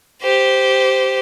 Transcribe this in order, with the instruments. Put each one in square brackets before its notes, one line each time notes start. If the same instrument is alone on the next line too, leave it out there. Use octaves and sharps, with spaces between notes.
[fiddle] G4 C5